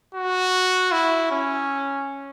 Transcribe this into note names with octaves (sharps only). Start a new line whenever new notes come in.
F#4
E4
C#4